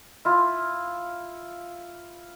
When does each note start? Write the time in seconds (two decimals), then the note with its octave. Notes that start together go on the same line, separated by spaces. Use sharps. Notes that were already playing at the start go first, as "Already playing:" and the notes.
0.25 E4 F4